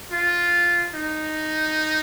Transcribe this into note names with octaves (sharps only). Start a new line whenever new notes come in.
F4
D#4